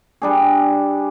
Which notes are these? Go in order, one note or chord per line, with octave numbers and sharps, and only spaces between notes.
G3 D4 G#4